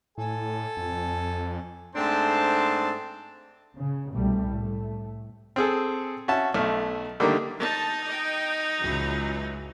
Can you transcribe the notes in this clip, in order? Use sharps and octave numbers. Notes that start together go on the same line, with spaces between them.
A2 A4 G#5
F2
G#2 A3 C4 D4 C5 A5
C#3
C2 B2 G3 A3
A2 A3
C4 G#4 A4
C#4 F#4 E5 A5
B1 A3 F6
D3 D#3 G3 A3 A#3
D#4 A5
D#5 G5
C#2 E3 F#3